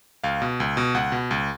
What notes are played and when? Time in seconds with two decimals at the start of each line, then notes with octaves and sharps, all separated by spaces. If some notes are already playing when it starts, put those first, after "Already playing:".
0.24 C#2 F5
0.42 B2
0.60 C#2
0.77 B2
0.94 C#2 F#5
1.12 B2
1.31 C#2